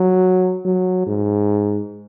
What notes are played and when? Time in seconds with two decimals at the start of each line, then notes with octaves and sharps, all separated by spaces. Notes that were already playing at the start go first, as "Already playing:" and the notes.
Already playing: F#3
0.65 F#3
1.07 G#2